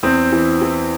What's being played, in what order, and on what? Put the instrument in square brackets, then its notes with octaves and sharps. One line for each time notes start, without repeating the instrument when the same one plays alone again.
[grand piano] E2 C4
E3
E3